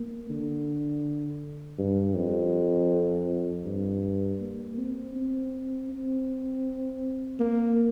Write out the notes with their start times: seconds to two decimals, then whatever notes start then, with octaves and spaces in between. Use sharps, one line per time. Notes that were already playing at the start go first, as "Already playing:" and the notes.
Already playing: A#3
0.29 D3
1.79 G2
2.15 F2
3.65 G2
4.40 A#3
4.77 C4
5.15 C4
5.90 C4
7.40 A#3